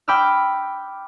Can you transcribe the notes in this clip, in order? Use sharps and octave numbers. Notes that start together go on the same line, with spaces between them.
G5 B5 D6 E6 F6